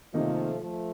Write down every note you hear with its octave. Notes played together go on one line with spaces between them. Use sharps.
C3 D#3 F3 G3 A3 A#3 D#4
F3 A3